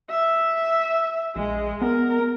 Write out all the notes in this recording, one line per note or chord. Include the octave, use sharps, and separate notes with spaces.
E5
A#1 G#3
B3 A#4